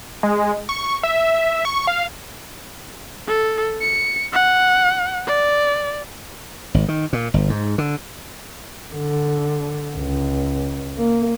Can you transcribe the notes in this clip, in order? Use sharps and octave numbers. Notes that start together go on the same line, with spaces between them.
G#3
C#6
E5
C#6
F5
A4
C#7
F#5
D5
G#1
D#3
A#2
G1
G#2
D3
D3
C#2
A#3